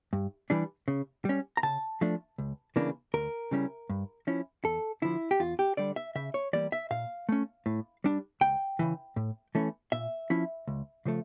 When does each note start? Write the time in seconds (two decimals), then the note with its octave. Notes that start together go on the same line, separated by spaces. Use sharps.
0.13 G2
0.50 E3 G3 D4
0.88 C#3
1.25 G3 C#4
1.57 A#5
1.63 C#3 A5
2.01 F3 A3 D4
2.38 C#2
2.76 C#3 E3 A#3 D4
3.14 D2 A#4
3.51 C#3 G3 C#4 E4
3.90 G2
4.27 F3 C#4 E4
4.64 E2 A4
5.02 D3 F3 E4
5.31 G4
5.40 E2 F4
5.59 G4
5.77 D3 G3 D5
5.96 E5
6.15 C#3 E5
6.34 C#5
6.53 E3 G3 A#3 D5
6.72 E5
6.91 A#2 F5
7.29 A3 C#4
7.66 A2
8.04 G3 D4
8.41 C#2 G5
8.79 C#3 E3
9.16 A2
9.55 E3 A3 C#4
9.92 A#2 E5
10.30 F3 C#4 E4
10.68 C#2
11.05 C#3 F3 A3